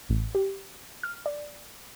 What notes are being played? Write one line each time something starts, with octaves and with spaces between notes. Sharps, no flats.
A1
G4
F6
D5